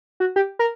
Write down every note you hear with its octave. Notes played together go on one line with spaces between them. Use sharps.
F#4
G4
A#4